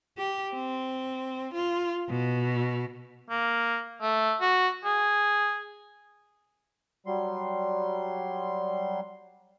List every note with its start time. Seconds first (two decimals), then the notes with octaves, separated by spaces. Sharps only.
0.18 G4
0.54 C4
1.54 F4
2.09 B2
3.30 A#3
4.02 A3
4.41 F#4
4.85 G#4
7.06 F#3 G3 C6